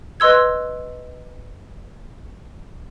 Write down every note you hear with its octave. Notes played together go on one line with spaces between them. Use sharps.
B4 D#5 C6 E6 G#6